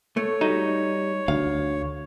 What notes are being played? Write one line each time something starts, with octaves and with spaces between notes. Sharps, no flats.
A3 C#5
G3 D#4 F#4
D2 F5